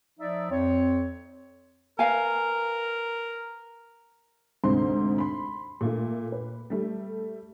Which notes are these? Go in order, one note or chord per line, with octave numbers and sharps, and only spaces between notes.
F3 D#4 D5 E5
F2 C4 C#5
A#4 B4 F5 G#5
D2 G#2 C3 C5 C6
B5 C6
A#2 A3
B4
G3 A3